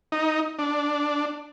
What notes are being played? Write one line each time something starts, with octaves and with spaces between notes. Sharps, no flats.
D#4
D4